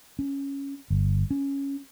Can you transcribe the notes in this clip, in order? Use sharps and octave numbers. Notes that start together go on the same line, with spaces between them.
C#4
G1
C#4